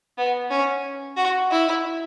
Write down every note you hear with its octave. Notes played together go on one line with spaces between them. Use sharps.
B3
C#4
F#4
E4